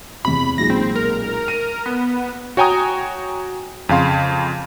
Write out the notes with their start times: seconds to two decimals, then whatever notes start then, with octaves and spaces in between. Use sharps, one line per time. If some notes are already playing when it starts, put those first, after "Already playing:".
0.25 E2 C3 B5
0.58 B1 A#2 G#3 A#6
0.70 C4
0.96 A#4
1.48 D#7
1.86 B3
2.57 F#4 C#5 G5 G#5 A#5 D#6
3.89 F2 C#3 F5 C6